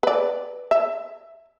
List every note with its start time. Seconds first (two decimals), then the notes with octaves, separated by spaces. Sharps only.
0.03 B4 D5
0.71 E5